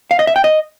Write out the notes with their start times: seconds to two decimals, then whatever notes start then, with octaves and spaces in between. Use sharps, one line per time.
0.11 F5
0.19 D#5
0.27 E5
0.36 G5
0.44 D#5